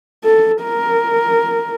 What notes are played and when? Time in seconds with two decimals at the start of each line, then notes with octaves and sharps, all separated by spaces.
0.24 A4
0.63 A#4